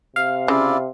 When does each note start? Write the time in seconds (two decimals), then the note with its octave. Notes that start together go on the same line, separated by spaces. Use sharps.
0.16 C3 F5
0.48 C#3 E4 F4 D5